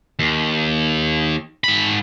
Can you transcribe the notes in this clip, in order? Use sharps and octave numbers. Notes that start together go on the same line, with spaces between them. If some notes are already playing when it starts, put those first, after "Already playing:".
D#2
G#2 B5